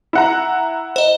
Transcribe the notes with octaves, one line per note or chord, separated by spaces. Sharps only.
E4 F#5 A#5
C5 D#5